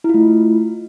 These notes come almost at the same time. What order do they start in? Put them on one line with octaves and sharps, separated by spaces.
E4 F4 A3